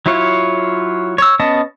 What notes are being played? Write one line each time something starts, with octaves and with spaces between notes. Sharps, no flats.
F#3 E4 F4 C#5
C#5 E6
B3 C#4 D#5 A5